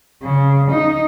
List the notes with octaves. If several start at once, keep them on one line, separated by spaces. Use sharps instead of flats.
C#3
D#4